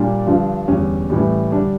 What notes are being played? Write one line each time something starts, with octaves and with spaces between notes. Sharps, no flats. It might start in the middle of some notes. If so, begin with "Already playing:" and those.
Already playing: A#2 G3 D4
G2 D3 F3
E2 D3 G3 C#4
A2 E3 G3
D3 G3 D4